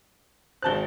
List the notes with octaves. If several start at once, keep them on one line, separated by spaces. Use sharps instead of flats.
G#1 C5 A5 F#6 G7